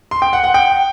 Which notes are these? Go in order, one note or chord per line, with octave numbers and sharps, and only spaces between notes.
C6
G5
F#5
F#5
G5